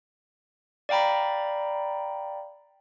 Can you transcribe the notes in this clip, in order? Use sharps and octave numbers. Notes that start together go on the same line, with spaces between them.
D5 F5 G5 A#5 B5